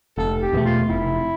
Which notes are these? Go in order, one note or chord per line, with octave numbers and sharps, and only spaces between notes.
F1 A4
G4
E2 B2 A3
F4
F1 E4